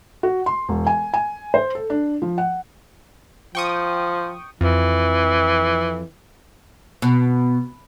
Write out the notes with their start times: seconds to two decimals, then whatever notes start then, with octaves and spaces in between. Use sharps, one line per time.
0.23 F#4
0.46 C6
0.69 E1
0.87 G#5
1.14 G#5
1.54 C5
1.75 A4
1.90 D4
2.22 F3
2.38 F#5
3.55 F3 G5 C#6 D#6
4.61 F2 E3
7.02 B2